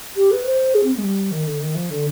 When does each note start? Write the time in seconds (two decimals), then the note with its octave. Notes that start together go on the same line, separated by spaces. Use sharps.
0.16 G4
0.31 B4
0.45 C5
0.74 G#4
0.83 C4
0.93 B3
0.97 G#3
1.03 G3
1.31 D#3
1.46 D3
1.61 D#3
1.75 F3
1.90 D3